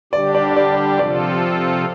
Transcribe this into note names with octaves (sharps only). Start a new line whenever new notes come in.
D3 G3 D4 G4 D5
D5
D5
C3 F3 C4 F4 A4 D5